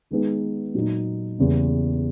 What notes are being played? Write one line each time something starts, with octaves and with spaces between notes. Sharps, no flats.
D#3 G#3 B3 D#4 G#4
A#2 F#3 A#3 D#4
E2 C#3 E3 G3 A#3